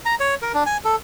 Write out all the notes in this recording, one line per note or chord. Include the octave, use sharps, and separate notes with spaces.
A#5
C#5
A#4
D4
G#5
A4